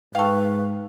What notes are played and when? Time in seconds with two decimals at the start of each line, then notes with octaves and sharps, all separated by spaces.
0.15 G#2 A4 B4 F5 G5 C#6